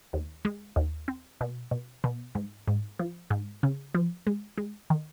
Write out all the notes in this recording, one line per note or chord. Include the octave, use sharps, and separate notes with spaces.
D#2
G#3
D#2
C4
B2
B2
B2
G#2
G#2
F3
G#2
C#3
F3
G#3
G#3
D#3